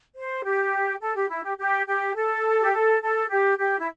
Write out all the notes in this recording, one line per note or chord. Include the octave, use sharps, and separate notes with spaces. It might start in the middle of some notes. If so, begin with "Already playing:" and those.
C5
G4
A4
G4
E4
G4
G4
G4
A4
G4
A4
A4
G4
G4
E4